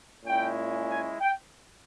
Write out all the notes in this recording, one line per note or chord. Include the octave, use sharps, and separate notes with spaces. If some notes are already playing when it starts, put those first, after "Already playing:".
A#2 G#3 C#4 E4 G5
G#5
G5